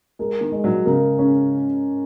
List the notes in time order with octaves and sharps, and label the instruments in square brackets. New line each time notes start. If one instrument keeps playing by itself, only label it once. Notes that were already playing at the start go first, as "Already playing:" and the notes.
[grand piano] G#3 [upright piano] A#4
[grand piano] D#3
[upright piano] G#3
[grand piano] F#3
[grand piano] C#3 [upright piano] A#4
[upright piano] C#4